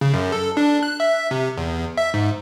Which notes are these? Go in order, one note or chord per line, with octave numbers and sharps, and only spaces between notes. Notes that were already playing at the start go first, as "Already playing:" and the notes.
C#3
F#2
A4
D4
F#6
E5
C3
E2
E5
G#2